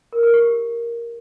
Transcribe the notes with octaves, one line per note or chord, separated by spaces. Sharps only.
A#4
A#4
G4